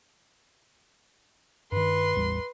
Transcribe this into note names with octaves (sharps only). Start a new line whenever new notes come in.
G2 D#3 B4 C6
A1 E2 G3